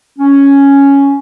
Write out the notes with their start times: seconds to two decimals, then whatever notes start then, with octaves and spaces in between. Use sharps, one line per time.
0.19 C#4